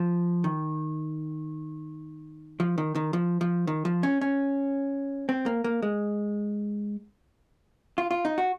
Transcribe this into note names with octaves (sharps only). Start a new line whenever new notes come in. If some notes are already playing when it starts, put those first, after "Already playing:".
Already playing: F3
D#3
F3
D#3
D#3
F3
F3
D#3
F3
C#4
C#4
C4
A#3
A#3
G#3
F4
F4
D#4
F#4